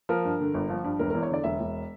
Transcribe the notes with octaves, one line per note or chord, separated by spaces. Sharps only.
F3 A#4
G2
D3
G1
F3
G2
E1 A#4
A#4
E2
C#5
D3 D5
E1 E5
E1